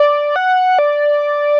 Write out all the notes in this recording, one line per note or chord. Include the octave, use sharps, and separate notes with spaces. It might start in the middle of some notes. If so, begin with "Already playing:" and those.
Already playing: D5
F#5
D5